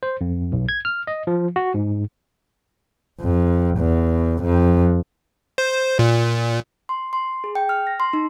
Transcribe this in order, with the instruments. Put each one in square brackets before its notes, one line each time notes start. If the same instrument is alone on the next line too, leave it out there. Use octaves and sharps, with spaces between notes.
[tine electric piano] C5
F2
B1
G#6
F6
D#5
F3
F#4
G#2
[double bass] F2
E2
F2
[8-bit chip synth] C5
A#2
[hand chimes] C6
C6
G#4
G5
F6
A#6
C6
D#4